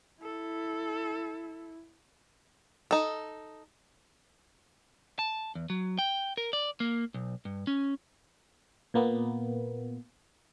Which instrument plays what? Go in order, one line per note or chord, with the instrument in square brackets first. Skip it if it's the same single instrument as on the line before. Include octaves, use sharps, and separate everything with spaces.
[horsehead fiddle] E4 [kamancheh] A4
[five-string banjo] D#4 A4
[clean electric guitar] A5
E2
F#3
G5
A#4
D5
A#3
B1
G2
C#4
[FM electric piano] A#2 A#3 B3